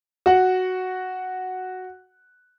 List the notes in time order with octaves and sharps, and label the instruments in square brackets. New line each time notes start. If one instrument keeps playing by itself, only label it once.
[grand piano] F#4 F#5